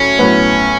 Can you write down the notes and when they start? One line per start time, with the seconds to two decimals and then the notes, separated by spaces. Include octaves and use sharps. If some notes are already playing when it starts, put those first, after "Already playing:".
Already playing: A2 F#3 C#4 E4
0.19 A2 F#3 B3 E4 B4